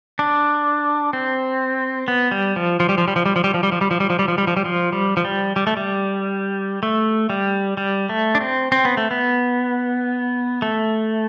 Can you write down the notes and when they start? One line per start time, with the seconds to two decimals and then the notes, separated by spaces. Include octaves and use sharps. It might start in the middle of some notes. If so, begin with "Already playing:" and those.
0.19 D4
1.13 C4
2.08 B3
2.31 G3
2.56 F3
2.80 F3
2.89 G3
2.98 F3
3.08 G3
3.16 F3
3.26 G3
3.36 F3
3.44 G3
3.54 F3
3.63 G3
3.72 F3
3.81 G3
3.91 F3
4.00 G3
4.10 F3
4.19 G3
4.28 F3
4.38 G3
4.47 F3
4.57 G3
4.65 F3
4.92 G3
5.17 F3
5.25 G3
5.56 G3
5.67 A3
5.77 G3
6.83 A3
7.30 G3
7.77 G3
8.09 A3
8.35 D4
8.41 C4
8.72 C4
8.85 B3
8.97 A3
9.11 B3
10.62 A3